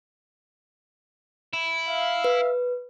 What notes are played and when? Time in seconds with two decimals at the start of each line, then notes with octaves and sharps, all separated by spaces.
1.53 E4
1.88 E5 F5
2.24 B4